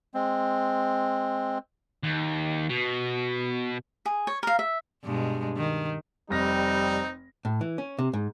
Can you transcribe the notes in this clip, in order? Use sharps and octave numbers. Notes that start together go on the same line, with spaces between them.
G#3 C4
D#2
B2
G#4
C#5
A#4 F5
E5
G2 B2 G#3
D#3
F1 G3 C4 D#4 A#6
A2
E3
C#4
C3
G#2